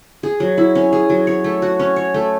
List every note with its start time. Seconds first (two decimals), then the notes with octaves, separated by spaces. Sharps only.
0.23 G#4
0.40 F#3
0.58 E4
0.75 C#4
0.93 G#4
1.10 F#3
1.27 C#5
1.44 A3
1.62 F#4
1.80 C#4
1.96 C#5
2.14 A3